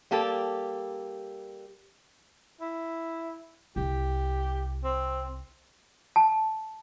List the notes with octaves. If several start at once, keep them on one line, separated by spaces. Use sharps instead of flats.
G3 A#3 G4 A4
E4
C2 G4
C4
A5